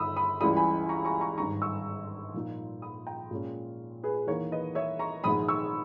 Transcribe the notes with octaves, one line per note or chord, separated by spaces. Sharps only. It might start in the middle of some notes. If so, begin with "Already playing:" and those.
Already playing: G1 G2 D#3 B5 D#6 E6
B5 D#6
C#2 C#3 E3 G3 B5 D#6
G#5 B5
A#5 C#6
A#5 C#6
A#5 C#6
G#1 G2 D#3 A#5 C#6
C#6 E6
A#1 A#2 A#3 D#4
B5 D#6
G5 A#5
A#2 G#3 C#4
G#4 B4
E2 D#3 A#3 A#4 C#5
B4 D#5
C#5 E5
A#5 C#6
A#1 G#2 D#3 G#3 B5 D#6
C#6 E6